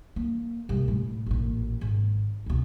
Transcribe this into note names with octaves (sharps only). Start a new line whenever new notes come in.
A#3
C2 G#3
A2
A1 A#2
G#1
C#2 B2